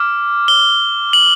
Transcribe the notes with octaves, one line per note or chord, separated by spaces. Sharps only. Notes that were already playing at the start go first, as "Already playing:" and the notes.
Already playing: D6 F6
G7
F#7